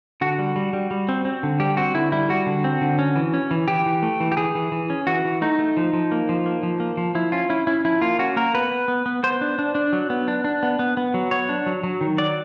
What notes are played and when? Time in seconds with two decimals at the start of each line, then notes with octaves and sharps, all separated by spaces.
0.21 D3 F#4
0.39 G3
0.56 G3
0.73 G3
0.91 G3
1.09 C4
1.25 C4
1.43 D3
1.60 G3 G4
1.77 C4 F#4
1.94 D3 E4
2.12 G3 E4
2.29 G3 F#4
2.46 D3
2.64 C4
2.81 D3
2.99 C#4
3.16 E3
3.34 C#4
3.51 E3
3.68 E3 G4
3.86 E3
4.02 A3
4.20 E3
4.32 G4
4.37 E3 G#4
4.55 E3
4.72 E3
4.90 C#4
5.07 E3 F#4
5.25 E3
5.41 A3 D#4
5.59 A3
5.77 F3
5.93 F3
6.11 A#3
6.29 F3
6.46 A#3
6.63 F3
6.80 A#3
6.97 F3
7.15 F3 E4
7.32 C#4 F4
7.49 C#4 E4
7.67 C#4 E4
7.85 F3 E4
8.01 A#3 F4
8.19 C#4 F#4
8.37 A#3 A#4
8.54 B3 B4
8.71 B3
8.88 B3
9.06 B3
9.23 B3 C5
9.41 D4
9.59 D4
9.75 D4
9.93 F#3
10.10 B3
10.28 D4
10.44 D4
10.63 B3
10.79 B3
10.97 B3
11.14 F#3
11.31 B3 C#5
11.49 D4
11.66 F#3
11.84 F#3
12.01 D#3
12.18 F#3 D5